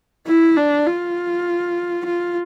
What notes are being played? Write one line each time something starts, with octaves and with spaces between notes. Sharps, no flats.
E4
D4
F4
F4